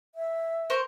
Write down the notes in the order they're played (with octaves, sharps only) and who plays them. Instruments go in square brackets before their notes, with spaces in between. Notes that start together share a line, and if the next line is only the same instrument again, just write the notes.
[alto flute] E5
[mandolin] A#4 C5 C#6